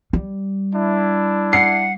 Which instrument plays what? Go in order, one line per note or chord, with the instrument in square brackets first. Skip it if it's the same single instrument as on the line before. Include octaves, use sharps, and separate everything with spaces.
[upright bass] G3
[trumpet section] D4 E4
[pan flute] F#5 [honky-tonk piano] C7